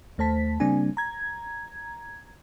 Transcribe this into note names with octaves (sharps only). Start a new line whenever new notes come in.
D#2 A3 C5 A5 B6
C#3 G3 A#3 C4 D4 G#5
A#5 G#6